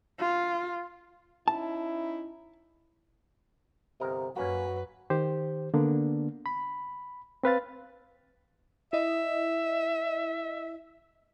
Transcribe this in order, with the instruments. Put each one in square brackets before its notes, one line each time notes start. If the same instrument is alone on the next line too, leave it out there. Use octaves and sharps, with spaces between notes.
[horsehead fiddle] F4
[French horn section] C#4 D#4 E4 [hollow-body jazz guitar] A5
[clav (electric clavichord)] G1 A#4 D#5 [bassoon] C3
[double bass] F#2 [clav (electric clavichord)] A#3 C#4 [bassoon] F#4 [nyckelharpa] B4
[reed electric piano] D#3 G4 C5
D3 A#3 B3 D4
B5
C4 B4 F5 A6
[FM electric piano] E4 D#5 [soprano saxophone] E5